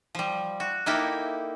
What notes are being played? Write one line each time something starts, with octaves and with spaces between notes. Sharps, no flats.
F3 G3
F#4
A#3 D#4 E4 G4 A4 A#4